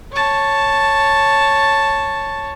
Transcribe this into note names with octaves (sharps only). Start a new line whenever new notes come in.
C#5 A5